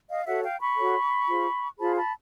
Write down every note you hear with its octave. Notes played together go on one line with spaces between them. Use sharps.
D#5 F5
F#4 A4 C#5 E5 F#5
F5 G5
B5 C#6
F#4 A4 C#5
F4 G#4 C5
F4 G#4 C5 A5 B5
A5 B5